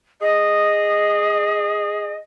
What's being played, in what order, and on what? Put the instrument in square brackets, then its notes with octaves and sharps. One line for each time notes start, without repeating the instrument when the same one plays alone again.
[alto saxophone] G#4 [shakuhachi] D#5